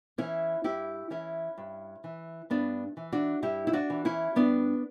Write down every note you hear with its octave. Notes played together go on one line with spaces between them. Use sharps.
E3 C#4 E4
G2 E4 G4
E3 C#4 E4
G2
E3
G2 B3 D4
E3
D4 F#4
G2 E4 G4
E4
D4 F#4
E3
C#4 E4
G2 B3 D4